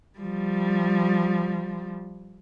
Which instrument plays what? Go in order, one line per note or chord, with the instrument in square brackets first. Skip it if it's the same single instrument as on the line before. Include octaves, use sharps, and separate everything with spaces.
[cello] F3 G3